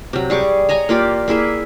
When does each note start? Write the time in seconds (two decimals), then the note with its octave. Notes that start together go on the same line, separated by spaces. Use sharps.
0.13 C3 F#3
0.30 G3 G#4 C#6 D6
0.69 C#5 D#5 G#5 A#5
0.89 A#3 F4 G4 D5
1.28 A#3 E4 G#4 E5